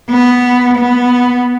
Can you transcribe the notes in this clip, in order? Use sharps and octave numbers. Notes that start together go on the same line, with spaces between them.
B3
B3